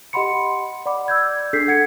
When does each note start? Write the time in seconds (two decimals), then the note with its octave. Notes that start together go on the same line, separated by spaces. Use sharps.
0.13 G4 D#5 F#5 B5 C6 C#7
0.86 D5 F#5 B5 D6
1.08 E6 G6 G#6
1.53 D4 G#4 A4 G6 B6 C7
1.68 F#5 G#6 C#7